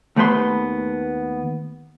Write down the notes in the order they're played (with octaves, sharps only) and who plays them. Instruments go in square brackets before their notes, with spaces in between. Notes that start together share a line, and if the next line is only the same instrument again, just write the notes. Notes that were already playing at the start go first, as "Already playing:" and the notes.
[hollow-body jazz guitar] D#2 A3 B3 B4 C6